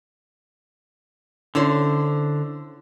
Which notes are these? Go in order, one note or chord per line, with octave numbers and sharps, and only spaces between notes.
D3 C#4 E4 C5